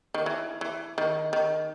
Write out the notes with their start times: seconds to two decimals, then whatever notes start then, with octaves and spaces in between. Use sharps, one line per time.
0.14 D#3
0.26 E3
0.61 E3
0.98 D#3
1.33 D#3